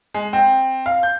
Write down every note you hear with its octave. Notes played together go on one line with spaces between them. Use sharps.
G#3
C4
F5
G6